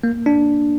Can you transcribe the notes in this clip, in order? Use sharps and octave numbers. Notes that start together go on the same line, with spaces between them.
A#3
D4